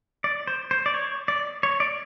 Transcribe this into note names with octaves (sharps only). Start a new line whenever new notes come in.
D5
C5
C5
D5
C#5
D5
C#5
D5